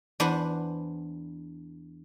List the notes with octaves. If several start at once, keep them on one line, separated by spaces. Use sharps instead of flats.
E2 D4 B4 C5 F#5 G#5